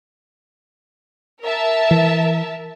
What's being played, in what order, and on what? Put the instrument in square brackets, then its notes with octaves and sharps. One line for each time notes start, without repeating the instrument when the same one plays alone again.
[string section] A#4 E5 A5
[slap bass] E3